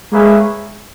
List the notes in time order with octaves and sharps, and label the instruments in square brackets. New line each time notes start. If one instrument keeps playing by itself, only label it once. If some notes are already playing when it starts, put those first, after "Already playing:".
[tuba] G#3 [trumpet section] A#3 C#4 G#4 B4 E5